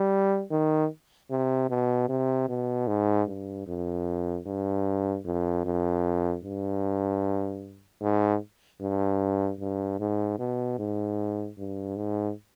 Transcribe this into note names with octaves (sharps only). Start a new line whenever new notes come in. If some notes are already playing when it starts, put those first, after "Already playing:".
Already playing: G3
D#3
C3
B2
C3
B2
G#2
G2
F2
G2
F2
F2
G2
G#2
G2
G2
G#2
B2
G#2
G2
G#2